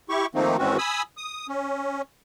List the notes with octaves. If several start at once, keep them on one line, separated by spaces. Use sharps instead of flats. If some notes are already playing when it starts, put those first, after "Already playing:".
E4 G4 C#6
D#3 F3 A3 A#3 C4 D#4
G#2 D#3 E3 C4 C#4 F#4
G#5 B5 D#6 E6
D#6
C#4